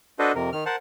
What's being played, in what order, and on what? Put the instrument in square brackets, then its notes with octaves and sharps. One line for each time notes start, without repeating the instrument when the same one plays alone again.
[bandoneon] D4 F#4 A4 B4 C5 D#5
F2 C3 A#4
D#3 F6
A#4 C5 F#5 A5